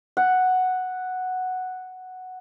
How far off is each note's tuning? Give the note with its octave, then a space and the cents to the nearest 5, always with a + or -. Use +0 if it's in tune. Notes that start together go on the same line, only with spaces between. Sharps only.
F#5 +0